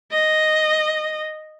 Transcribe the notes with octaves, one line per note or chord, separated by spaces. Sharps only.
D#5